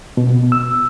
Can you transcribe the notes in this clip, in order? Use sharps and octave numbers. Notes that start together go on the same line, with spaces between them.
B2
E6